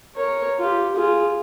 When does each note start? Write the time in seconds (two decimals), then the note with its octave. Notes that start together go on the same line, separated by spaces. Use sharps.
0.15 A#4 C#5
0.59 F4 G4
0.95 F4 G#4